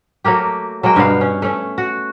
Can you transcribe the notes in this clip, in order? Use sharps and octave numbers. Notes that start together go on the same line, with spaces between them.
F#3 A3 A#3 G4
F#3 G#3 A#3 G5
G2 B2 B3 F5
C#4
A3 C#4
F#4